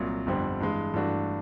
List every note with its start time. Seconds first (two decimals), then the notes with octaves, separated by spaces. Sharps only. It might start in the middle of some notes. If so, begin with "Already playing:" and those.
Already playing: C2 A#2 F#3
0.26 G1 F2 D3 G3 C4
0.60 G2 E3 G#3
0.94 G2 E3 A3 D4 F#4